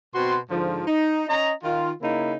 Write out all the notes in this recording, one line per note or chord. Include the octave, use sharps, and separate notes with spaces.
B2 C4 F#4 C6
G#2 D3 F3
D#4
C#4 D#5 A#5
D#3 F4
C#3 A#3 D#4 E4